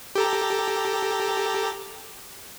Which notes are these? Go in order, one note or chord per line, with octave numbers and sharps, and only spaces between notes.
G4 A4 A#5